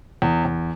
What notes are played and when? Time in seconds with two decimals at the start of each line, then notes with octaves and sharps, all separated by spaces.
0.22 E2
0.45 E2